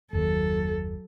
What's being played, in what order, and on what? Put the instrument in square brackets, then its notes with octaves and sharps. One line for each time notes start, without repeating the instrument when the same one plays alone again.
[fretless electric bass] F#1 D#2 D#3 [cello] F#3 A4